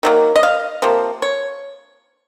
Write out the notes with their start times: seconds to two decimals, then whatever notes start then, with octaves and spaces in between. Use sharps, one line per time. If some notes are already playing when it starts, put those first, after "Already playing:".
0.03 D#3 F#3 A#3
0.36 D#5
0.43 F5
0.82 C3 F3 A#3
1.22 C#5